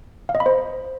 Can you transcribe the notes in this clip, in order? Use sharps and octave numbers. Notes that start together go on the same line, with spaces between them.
F5
D#5
B5
C5